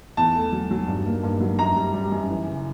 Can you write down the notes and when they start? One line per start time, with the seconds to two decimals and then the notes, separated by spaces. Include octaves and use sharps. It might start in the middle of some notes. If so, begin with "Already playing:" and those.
0.17 E2 A5
0.35 A3
0.52 F#3
0.71 F#3
0.87 G2
1.06 A#3
1.23 G2
1.40 F#3
1.59 F#2 A#5
1.76 G3
1.94 G3
2.12 F#2
2.30 E3
2.47 C#3